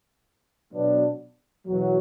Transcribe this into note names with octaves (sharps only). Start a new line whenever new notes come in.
B2 F#3 B3 D4
E2 B2 F#3